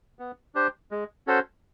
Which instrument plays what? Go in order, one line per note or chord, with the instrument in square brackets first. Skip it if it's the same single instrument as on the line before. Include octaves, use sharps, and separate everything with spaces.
[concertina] B3
D4 G4 C5
G#3
C#4 F#4 A4 C5